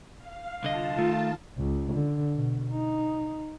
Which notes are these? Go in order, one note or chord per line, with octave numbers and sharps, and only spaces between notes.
F5
C2 D3 F4 D#5 F5 A5
D#3 A3
C#2
D3
B2
D#4